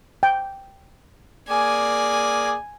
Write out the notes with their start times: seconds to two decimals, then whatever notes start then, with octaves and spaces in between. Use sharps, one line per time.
0.23 G5
1.48 A#3 G#4 D5 G#5